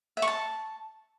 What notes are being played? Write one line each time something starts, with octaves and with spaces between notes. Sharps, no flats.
E5
C#6
A5